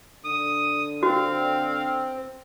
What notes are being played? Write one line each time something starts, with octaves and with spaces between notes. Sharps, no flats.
D3 D#6
C4 F#4 F5